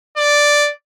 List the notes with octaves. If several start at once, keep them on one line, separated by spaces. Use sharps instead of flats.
D5